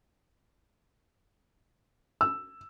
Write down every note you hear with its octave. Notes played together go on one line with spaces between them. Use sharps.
E6